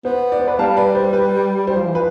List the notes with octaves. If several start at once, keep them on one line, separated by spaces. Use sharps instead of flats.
B3 C5
D5
C5
B4 D5
G3 F5 A5
B4 D5
C5
B4
G3 C5
F3
E3
F3 B4